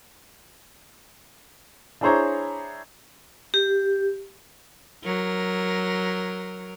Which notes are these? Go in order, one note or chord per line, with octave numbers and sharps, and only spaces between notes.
D4 E4 G#4 C5 C#5 A#5
G4
F#3 A#4